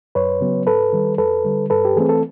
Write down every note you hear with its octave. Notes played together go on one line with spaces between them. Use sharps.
F#2 B4 C#5
C#3 F#3 B3
G#2 A4 B4
D#3 G3
F2 A4 B4
D3 G3
G2 A4 B4
G4
E3 A3 C4 G#4
A4